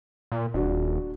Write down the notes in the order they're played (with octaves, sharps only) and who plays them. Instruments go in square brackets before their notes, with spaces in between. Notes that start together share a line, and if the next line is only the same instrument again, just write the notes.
[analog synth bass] A#2
[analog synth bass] D#1 [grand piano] D4 F#4